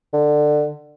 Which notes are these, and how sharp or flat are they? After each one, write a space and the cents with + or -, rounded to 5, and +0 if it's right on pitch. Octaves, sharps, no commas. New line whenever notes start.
D3 +20